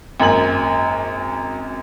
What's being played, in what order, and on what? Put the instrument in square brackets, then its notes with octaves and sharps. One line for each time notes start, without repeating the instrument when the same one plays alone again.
[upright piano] G#1 F#2 A#3 G#5 F#7